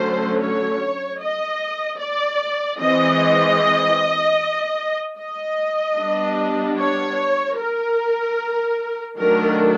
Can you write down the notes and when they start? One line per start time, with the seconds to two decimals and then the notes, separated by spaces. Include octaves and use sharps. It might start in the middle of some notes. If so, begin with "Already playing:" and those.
Already playing: D3 F#3 A3 C#4 C5
0.40 C#5
1.20 D#5
2.00 D5
2.80 E3 G#3 C4 D#5
5.18 D#5
5.98 G3 B3 D4
6.79 C#5
7.58 A#4
9.17 D#3 F#3 A3 D4 A#4